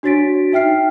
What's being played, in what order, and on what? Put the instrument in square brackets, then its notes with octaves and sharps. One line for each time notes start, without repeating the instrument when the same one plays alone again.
[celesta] D4 F#4 C#5 A6 B6 D7
D#4 E5 G5 F6 C7